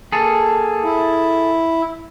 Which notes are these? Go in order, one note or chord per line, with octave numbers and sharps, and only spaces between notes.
A#3 G#4 A4
E4